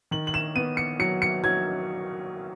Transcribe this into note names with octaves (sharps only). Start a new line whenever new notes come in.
D#3 F#7
F#7
E7
B3 D#7
C#7
F#3 C#7
C#7
F#3 G#6